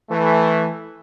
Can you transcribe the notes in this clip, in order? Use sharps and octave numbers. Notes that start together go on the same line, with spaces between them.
E3 A3